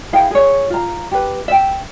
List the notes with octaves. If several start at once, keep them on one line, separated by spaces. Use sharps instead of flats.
E4 G#4 F5 G5
G#4 C#5
F4 A#5
G4 B4
E5 G5